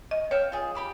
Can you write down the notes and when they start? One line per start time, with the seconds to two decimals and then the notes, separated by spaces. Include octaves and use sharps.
0.11 D#5
0.31 C#5 E5 F5 G5
0.52 F4 G#4
0.75 G4 B5 D6